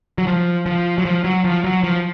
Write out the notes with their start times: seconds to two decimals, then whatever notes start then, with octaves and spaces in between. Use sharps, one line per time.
0.18 F#3
0.27 F3
0.66 F3
0.98 F#3
1.05 F3
1.24 F#3
1.44 F3
1.64 F#3
1.83 F3